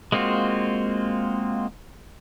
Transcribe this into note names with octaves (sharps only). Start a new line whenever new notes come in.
G#3 A#3 C4 F4 F#4